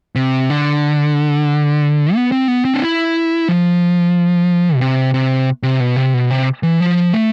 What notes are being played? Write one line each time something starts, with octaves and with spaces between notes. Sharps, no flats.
C3
D3
B3
C4
B3
C4
D4
E4
F3
B2
C3
C3
C3
B2
C3
B2
C3
E3
F3
A3